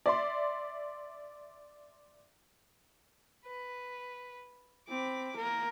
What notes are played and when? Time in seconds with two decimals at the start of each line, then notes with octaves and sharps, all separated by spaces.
0.06 D5 E5 C6
3.46 B4
4.88 C4 B5 D6
5.36 A#3 A#4